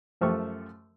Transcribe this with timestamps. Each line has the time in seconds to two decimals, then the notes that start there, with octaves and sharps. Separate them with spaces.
0.21 F#2 F3 A3 G4 C#6